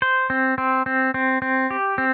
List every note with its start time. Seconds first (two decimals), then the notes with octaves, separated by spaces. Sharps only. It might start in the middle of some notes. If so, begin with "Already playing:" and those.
0.02 C5
0.30 C4
0.58 C4
0.86 C4
1.14 C4
1.42 C4
1.71 G4
1.98 C4